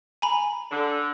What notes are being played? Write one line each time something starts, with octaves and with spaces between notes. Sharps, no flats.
G#5 A#5 B5
D3